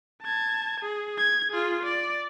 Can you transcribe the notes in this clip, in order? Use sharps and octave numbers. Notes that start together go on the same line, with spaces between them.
A5 G#6
G#4
G#6
F4 G#4
D5